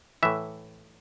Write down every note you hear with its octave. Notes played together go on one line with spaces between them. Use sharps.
A2 E3 E5